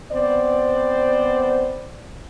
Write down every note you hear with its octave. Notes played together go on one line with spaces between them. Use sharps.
B3 C4 C5 D5